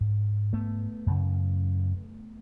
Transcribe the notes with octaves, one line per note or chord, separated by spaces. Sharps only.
G#2
A3 B3
F#2 C#3